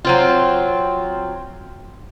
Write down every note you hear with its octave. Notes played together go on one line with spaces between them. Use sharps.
F#3 C4 F4